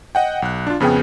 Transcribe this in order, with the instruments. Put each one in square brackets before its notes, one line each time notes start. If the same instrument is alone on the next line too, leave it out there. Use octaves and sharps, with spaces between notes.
[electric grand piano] D#5 F#5 G5
B1 F#6
D4 F4
F2 C#3 B3 G#4 G5